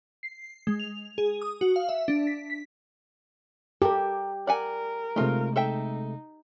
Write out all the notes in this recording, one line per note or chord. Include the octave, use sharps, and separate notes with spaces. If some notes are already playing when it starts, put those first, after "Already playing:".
C7
G#3
F7
G#4
D#6
F#4
F5
E5
D4
B6
B6
G4 A4 A#4
A#4 D5 F#5 G#5
C3 G#3 A3 D#4 F4
D#4 A4 E5 G5